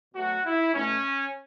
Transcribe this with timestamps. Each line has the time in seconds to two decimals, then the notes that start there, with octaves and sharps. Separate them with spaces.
0.14 B2 F#3 A3 F#4
0.45 E4
0.73 B2 A3 C#4